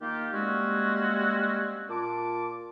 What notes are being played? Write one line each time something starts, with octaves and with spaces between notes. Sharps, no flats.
D#3 A#3 D#4 F4 G4
G3 G#3 A#3 C4 C#4 F#4
A#2 F4 A5 D6